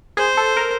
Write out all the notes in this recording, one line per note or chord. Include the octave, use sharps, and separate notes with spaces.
G#4 C5
A4
A#4